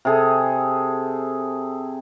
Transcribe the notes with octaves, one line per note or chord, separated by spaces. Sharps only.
C3 G#4 A4